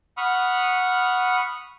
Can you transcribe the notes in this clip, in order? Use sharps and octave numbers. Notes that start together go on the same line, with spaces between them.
F#5 B5 C#6 D#6 F6